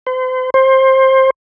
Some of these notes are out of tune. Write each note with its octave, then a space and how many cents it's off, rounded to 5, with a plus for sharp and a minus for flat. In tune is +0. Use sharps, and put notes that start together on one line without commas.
C5 -35
C5 +20